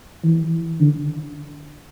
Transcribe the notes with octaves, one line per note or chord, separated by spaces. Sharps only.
E3
D3